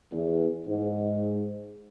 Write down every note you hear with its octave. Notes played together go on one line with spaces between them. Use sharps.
E2
G#2